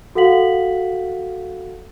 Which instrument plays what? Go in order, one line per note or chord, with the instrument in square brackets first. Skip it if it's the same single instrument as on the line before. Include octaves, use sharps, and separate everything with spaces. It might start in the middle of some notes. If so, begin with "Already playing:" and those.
[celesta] F#4 A4 F5 F#5 B6 F#7